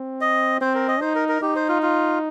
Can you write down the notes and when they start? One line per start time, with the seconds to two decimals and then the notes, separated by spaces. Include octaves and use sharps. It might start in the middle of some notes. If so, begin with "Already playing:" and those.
Already playing: C4
0.21 D#5
0.61 C4 C5
0.75 A#4
0.88 D#5
1.01 D#4 C5
1.15 A#4
1.29 A#4
1.42 D#4 G4
1.56 C5
1.68 F4
1.82 F4